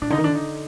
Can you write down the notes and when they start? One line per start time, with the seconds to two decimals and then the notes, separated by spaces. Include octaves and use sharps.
0.02 A#2 D4
0.10 D3 D#4
0.18 D#3
0.24 D4
0.27 D3
0.35 D#4